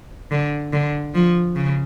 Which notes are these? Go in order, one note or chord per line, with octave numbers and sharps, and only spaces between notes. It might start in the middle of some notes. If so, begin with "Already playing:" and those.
D3
D3
F3
C#3